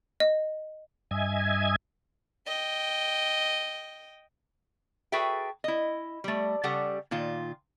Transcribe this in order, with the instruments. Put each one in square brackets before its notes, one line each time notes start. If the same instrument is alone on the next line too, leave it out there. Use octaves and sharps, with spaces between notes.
[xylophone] D#5
[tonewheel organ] G2 D#5 E5 G#5 G#6
[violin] D#5 G5
[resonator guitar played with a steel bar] F#4 G#4 A4 B4 E5 G5
E4 D#5
G3 A3
C#3 G3 G4 A4 F#5
A#2 D#3 F4